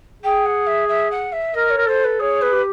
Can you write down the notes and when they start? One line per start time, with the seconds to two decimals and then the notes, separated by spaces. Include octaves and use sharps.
0.23 G#4 G5
0.45 F#5
0.67 E5
0.88 E5
1.11 F#5
1.32 E5
1.54 A#4 D#5
1.70 C#5
1.77 A#4
1.87 A4 C5
2.04 B4
2.20 G#4 C#5
2.41 B4
2.53 G4